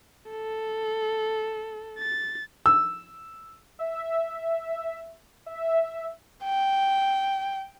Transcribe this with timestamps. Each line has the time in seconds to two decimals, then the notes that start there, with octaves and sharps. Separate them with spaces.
0.31 A4
1.99 A6
2.66 E6
3.79 E5
5.46 E5
6.44 G5